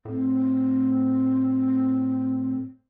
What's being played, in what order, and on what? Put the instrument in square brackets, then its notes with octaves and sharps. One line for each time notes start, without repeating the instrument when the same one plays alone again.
[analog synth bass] A2 [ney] C4